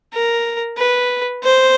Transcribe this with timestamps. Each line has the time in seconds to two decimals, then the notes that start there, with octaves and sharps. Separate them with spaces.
0.13 A#4
0.78 B4
1.44 C5